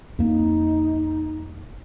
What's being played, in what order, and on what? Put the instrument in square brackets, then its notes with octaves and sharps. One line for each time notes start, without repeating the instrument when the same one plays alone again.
[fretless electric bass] F2 A#3 [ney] D#4